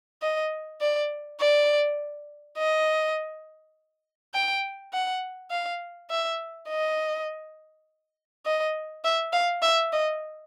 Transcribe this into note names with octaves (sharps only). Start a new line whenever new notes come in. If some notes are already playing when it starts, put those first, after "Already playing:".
D#5
D5
D5
D#5
G5
F#5
F5
E5
D#5
D#5
E5
F5
E5
D#5